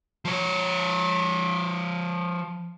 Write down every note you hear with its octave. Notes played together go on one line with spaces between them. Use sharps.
F3 C#5